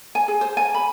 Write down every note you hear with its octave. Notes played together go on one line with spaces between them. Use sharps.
G#5
G#4
C5
G#5
B5